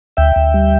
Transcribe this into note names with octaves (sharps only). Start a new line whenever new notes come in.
D2 E5 G5
D2
G3